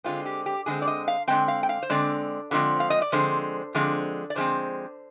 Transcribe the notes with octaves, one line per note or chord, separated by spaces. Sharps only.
D3 G#3 C4 F4
G4
G4
D3 G#3 C4 G#4
D5
D#5
F5
D3 G#3 C4 G5
F5
G5
F5
C5
D3 G#3 C4 D5
D3 F3 G#3 C4
F5
D#5
D5
D3 F3 G#3 C4 C5
D3 F3 G#3 C4
D5
D3 F3 G#3 C4 C5